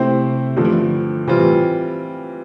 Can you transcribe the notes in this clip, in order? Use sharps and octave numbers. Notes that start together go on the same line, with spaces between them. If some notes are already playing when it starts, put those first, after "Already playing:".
Already playing: C3 A3 C4 E4 G4 C5
G2 D3 F3 A3
E3
D3
C3 E3 G3 C4 F4
A2